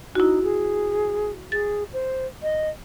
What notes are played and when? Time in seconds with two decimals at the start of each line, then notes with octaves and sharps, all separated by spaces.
0.15 D#4 E4 F#4
0.43 G#4
1.52 G#4 A6
1.93 C5
2.43 D#5